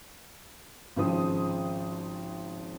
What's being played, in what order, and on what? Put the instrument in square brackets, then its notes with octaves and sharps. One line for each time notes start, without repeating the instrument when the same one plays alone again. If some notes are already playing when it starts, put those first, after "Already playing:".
[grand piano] G#1 C#3 F3 D#6